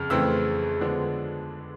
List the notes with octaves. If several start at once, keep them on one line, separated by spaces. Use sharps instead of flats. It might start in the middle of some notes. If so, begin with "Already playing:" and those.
Already playing: F2 C#3 F6
F2 C#3 E3 A3 C4 E6
D3 F3 G#3 B3 D4